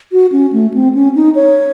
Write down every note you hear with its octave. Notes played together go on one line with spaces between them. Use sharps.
F#4
C#4
A3
C4
C#4
D#4
C#5